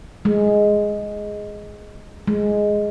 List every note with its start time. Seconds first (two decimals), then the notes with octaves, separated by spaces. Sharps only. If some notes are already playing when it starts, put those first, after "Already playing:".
0.25 G#3
2.27 G#3